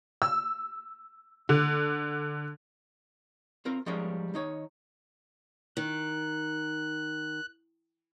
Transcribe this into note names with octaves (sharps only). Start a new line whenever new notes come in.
E6
D3
C4 F4 A#4
F3 G3 G#3 C#4 A#4
D#3 D#4 C#5
D#3 F#6